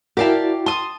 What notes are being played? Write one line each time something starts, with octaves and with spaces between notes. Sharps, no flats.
E4 F#4 G4 A#4 D5 F5 G5 A5
A5 C6 D#6